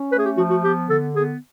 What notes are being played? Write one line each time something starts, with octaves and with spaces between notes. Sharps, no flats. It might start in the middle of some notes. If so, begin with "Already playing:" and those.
Already playing: C#4
A3 B4
G#4
G4
F3 F#4
F#4
B3 G4
D3 A4
B3 G#4